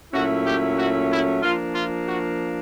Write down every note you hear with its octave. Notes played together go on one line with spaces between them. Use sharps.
A#2 F#3 A3 C#4 E4 F#4
G4
F#4
E4
F3 A#3 D4 F4
F4
F#4